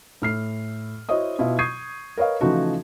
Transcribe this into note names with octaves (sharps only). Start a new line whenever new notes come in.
A2 F6 C7
E4 F#4 C5 C#5 D#5 D#6
B2 E4 F4
C#6 D#6 G6 G#6 C7 D#7
A#4 B4 C#5 D#5 F5
C#3 E3 F3 A3 D#4 F#4